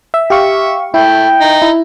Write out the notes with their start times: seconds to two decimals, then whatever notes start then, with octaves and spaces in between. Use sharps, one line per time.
0.14 E5
0.30 G4 E5 F5 C#6
0.94 A3 E4 G5
1.40 D#4
1.62 E4